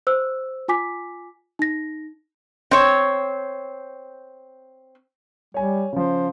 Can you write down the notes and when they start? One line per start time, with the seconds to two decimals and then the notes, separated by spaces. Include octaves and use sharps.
0.07 C5 E6
0.68 F4 G#5 D6 B6
1.59 D#4 A#6
2.71 C4 C#5
5.54 G3 C#5 G#5
5.93 C#3 F3 C5